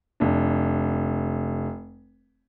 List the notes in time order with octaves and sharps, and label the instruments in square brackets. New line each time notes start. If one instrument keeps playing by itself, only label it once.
[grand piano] F1 D4